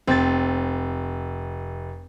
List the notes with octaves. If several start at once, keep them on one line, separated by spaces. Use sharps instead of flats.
F1 C4 A6